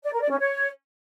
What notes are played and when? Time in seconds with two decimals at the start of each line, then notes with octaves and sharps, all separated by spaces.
0.04 D5
0.12 A#4
0.21 D5
0.30 C#4
0.39 C#5